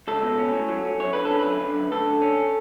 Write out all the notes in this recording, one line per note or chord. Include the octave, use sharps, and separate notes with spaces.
C#2 A4
B2
C#4
A2
F#3
C#4
F#2 C#5
D3 B4
A4
C#4
B4
F#2
D3
F#2
D2 A4
D3
C#4